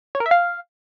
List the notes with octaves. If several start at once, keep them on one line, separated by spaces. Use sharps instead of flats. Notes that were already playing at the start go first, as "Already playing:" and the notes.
C#5
A#4
E5
F5